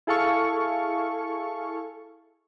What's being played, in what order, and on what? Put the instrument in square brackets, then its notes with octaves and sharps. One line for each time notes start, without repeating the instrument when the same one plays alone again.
[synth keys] E4 G#4 A4 F5 C#6